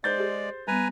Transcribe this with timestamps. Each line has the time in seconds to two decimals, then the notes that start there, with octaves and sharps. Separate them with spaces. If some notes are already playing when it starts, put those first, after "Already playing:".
0.04 G#3 C5 D5 G6 A6
0.18 G4 G#4
0.68 G3 B3 B4 G#5 A#5